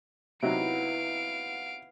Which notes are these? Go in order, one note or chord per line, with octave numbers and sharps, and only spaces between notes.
C3 F#3 B3 D#4 E4 F5 D7